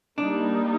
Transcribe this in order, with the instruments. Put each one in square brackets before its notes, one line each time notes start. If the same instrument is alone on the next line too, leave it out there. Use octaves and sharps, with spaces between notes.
[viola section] G3 A#3 D#4 [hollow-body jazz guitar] D4